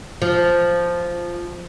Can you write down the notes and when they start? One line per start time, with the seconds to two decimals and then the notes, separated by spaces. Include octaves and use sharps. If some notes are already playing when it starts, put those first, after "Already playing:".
0.22 F3